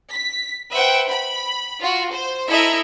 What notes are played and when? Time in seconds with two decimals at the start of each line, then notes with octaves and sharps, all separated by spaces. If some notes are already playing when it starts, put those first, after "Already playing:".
0.13 B6
0.73 B4 C5 E5 F#5 G5
1.08 B5
1.80 F4 F#4
2.12 C5
2.50 E4 A4 D#5 E5 A#5